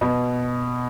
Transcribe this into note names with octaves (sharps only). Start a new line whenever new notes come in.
B2